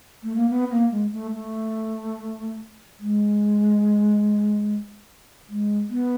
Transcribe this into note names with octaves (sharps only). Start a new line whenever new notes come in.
A3
A#3
B3
A#3
G#3
A3
A3
G#3
G#3
B3